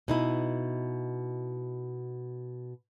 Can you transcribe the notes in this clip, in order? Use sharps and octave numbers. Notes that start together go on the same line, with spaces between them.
B2 D#4 E4